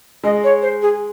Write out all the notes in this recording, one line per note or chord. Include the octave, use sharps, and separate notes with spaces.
G#3 D#5
C#5
C5
G#4